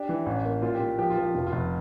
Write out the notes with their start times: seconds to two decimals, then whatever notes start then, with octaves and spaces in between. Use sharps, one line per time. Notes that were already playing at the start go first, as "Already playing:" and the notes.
Already playing: D4 G4
0.09 E3
0.26 A1
0.45 A#3
0.62 A#2 F4
0.75 G4
0.80 A#2
0.99 F3 G4
1.10 F4
1.17 F3
1.23 G4
1.35 F1 F4
1.46 F4
1.53 F1